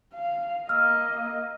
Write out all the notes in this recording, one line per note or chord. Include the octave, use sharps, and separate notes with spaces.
F5
A#3 D#5 E6 F6